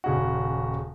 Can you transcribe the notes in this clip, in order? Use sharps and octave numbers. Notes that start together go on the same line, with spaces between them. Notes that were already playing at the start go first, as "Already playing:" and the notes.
D#1 C#3 F#4